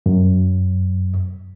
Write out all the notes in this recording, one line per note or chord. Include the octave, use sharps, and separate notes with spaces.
F#2